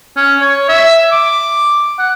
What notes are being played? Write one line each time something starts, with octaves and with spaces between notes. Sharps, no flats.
C#4
C#5
E5
D6
F#5